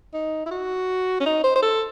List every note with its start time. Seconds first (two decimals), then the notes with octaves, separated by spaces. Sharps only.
0.14 D#4
0.46 E4
0.51 F#4
1.20 C#4
1.26 D#4
1.44 C5
1.56 C5
1.62 A4